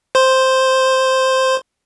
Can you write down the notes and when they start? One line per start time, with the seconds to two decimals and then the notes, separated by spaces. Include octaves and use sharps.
0.15 C5 C6